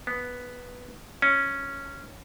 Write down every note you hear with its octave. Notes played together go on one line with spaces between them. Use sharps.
B3
C#4